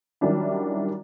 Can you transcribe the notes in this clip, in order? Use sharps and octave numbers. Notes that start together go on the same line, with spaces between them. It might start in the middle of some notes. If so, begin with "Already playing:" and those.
D#3 F#3 G3 C#4 D4 E4